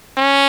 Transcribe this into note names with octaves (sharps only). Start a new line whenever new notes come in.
C#4